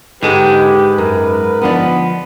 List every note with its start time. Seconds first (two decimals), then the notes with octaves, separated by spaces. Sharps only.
0.23 G#2 D3 G#3 G4 A4 B4
0.98 F#2 A#4
1.62 D3 F3 B3 D4